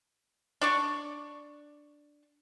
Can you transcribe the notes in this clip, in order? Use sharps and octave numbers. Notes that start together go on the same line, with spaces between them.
D4 D5 C#6